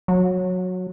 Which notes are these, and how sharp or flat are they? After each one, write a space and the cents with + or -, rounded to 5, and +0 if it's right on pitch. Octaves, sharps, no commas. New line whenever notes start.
F#3 -15